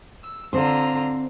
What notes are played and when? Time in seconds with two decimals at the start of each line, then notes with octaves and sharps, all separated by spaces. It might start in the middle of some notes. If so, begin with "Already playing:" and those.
0.24 E6
0.53 D3 C4 F4 C5 A#5